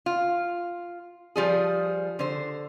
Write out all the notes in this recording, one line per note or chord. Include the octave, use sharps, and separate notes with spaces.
F4
F3 G3 G#4
D3 C5